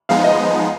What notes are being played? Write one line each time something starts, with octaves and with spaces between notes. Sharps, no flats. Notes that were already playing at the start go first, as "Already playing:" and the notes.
F3 G#3 B3 D#4 F5
D#5